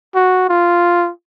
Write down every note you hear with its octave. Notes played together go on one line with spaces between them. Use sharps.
F#4
F4